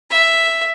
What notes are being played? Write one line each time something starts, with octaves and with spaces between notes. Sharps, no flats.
E5